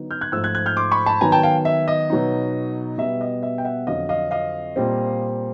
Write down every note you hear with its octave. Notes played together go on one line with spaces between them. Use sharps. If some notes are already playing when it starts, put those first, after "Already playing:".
Already playing: D3 F#3 B3 D#4
F6 G6
F#6 G#6
G#2 F3 A3 E6 F#6
F#6 G#6
F#6 G#6
F6 G6
C6 D6
B5 C#6
A5 B5
D#3 F#3 B3 G#5 A#5
G5 A5
F5 G5
E5
D#5
B2 F#3 B3 D#4
B2 G3 B3 E5
D#5
E5
G5
E5 F#5
F2 D3 F#3 D#5 F5
D#5 F5
D#5 F5
A#2 G3 C4